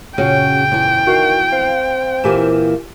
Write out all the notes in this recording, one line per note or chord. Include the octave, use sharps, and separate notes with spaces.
F#2 A#2 C#3 C#4 F#4 G#4 G5
E2 G#5
D#3 F#4 F5
C4 F5
A#2 E3 A#3 G4 G#5 E7